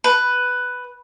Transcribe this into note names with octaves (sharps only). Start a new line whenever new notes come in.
B4